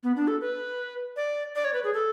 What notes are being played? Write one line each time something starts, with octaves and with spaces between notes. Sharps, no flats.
B3
D4
A4
B4
D5
D5
C#5
B4
G#4
A4